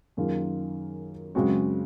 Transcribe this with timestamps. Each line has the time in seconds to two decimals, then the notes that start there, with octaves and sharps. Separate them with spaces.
0.17 F#2 D#3 A#3 F4 G#4
1.35 F#2 C#3 G#3 C4 F#4